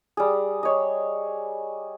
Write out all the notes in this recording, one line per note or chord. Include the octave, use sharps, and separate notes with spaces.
G3 G#4
C#5 D#5